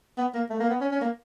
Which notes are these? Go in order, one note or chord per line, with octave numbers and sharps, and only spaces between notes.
B3
A#3
A3
A#3
B3
C#4
C#4
A#3